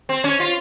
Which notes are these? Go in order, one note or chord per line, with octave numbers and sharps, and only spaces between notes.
C4
C#4
F4